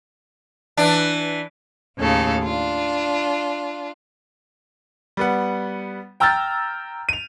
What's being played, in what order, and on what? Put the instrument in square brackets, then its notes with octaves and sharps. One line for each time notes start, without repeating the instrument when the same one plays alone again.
[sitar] E3 D4
[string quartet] D#2 A2 C#3 A4 F5
D4 F4
[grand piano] G3 B3 F#5
G5 A#5 E6 F6 G6 A6
D#7 F7